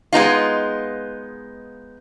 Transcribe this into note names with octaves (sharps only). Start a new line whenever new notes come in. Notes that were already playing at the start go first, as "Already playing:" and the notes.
G#3 B3 D#4 F4